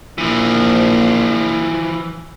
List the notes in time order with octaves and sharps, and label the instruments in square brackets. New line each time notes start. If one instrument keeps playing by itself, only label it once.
[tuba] A#1 [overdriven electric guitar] E3 F3